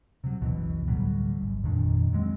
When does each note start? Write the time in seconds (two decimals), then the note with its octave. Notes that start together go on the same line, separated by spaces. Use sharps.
0.24 C3 F#3
0.41 F#1 C#2 B2 E3
0.88 D2 A2 F#3 G3
1.41 G#1
1.64 F2 A#2 D#3 D4
2.13 F#3 G#3 A#3 C4